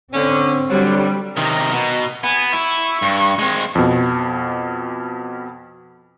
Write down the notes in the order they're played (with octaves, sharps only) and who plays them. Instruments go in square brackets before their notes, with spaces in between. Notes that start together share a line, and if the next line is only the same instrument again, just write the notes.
[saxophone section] D3 C#4 [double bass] C4
[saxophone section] D3 F#3 [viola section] G3
[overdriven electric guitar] C3 D#3 [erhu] A#5
[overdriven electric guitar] B2
[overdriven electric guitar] B3 [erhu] G#5
[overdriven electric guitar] E4 [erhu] C#6
[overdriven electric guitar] G2
G#3 C4
[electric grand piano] F2 B2